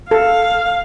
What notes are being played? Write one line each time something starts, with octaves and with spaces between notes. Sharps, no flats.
A4 F5